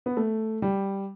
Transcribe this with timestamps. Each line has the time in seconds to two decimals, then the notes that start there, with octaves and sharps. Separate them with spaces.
0.06 B3
0.17 A3
0.62 G3